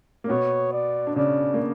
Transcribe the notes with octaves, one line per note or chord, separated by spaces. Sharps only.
A#3
B2 B3 C#5
D5
D4
C#3 C#4 D5
A#3